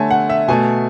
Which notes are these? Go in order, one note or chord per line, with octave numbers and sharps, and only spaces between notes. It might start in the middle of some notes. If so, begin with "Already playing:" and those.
Already playing: D3 A3 C#5 G#5 A5
F#5
E5
B2 A3 G#5